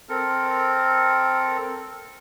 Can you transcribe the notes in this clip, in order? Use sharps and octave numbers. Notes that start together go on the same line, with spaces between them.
C4 A4 A#4